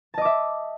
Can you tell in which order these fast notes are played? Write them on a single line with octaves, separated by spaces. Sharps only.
A5 D#5 D6 E5